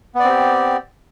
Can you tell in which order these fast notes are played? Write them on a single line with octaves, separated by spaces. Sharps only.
B3 D5 C4 G4